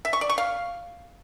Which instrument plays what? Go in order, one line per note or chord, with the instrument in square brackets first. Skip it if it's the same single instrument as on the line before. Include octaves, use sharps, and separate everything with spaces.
[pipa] E5
C#6
D5
C#6
F5